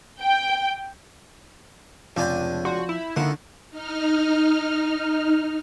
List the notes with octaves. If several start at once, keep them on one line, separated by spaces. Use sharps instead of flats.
G5
F1 C#2 F3 D4 G#5 G6
F#4 D5 C6 G6
E4 E7
C#2 D3 D#3 A#3 E4 F#5
D#4 F6